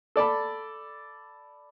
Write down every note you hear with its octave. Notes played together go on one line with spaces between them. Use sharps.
A4 D5 A5 B5